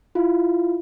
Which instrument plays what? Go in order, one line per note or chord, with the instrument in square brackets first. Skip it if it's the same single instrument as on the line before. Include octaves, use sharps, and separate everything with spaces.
[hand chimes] E4 F4